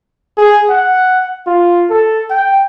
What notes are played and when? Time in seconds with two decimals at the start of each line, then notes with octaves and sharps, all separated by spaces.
0.38 G#4
0.69 F#5
1.47 F4
1.90 A4
2.30 G5